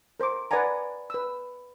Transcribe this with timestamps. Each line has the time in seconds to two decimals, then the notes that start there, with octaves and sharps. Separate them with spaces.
0.20 A#4 C5 A#5 D6
0.51 B4 D5 F#5 G#5 A#5
1.10 B4 E6